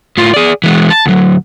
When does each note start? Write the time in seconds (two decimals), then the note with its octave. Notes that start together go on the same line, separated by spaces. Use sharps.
0.18 A2 F4
0.34 G#4 D5
0.64 E3 G#3
0.90 A5
1.06 D2 F#3